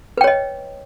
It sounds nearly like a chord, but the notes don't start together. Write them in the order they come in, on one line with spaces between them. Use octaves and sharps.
B4 G5 C#5 D#5